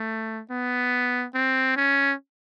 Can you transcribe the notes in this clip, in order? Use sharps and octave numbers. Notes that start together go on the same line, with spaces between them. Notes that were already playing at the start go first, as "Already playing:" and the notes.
Already playing: A3
B3
C4
C#4